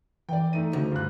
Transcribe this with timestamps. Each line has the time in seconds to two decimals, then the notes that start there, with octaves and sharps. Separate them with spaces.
0.29 E3 D5 G5
0.53 A3 D#4 D#7
0.73 D2 C#3
0.92 G2 F4 F#6